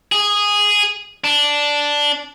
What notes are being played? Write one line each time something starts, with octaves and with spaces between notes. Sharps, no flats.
G#4
D4